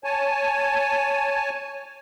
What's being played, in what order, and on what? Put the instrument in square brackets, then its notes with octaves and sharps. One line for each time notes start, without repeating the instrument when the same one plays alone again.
[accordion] C#5 G#5 A5